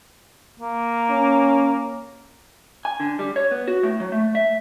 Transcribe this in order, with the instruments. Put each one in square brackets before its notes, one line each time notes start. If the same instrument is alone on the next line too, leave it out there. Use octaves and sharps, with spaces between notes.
[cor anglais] A#3
[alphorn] C#4
[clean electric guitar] G#5
D3
G3
C#5
B3
F#4
A2
F#3
A3
E5